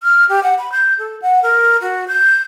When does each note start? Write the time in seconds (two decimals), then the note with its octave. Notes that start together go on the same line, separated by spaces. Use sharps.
0.03 F6
0.29 G4
0.43 F#5
0.58 B5
0.72 G6
0.99 A4
1.22 F#5
1.43 A#4
1.81 F#4
2.08 G6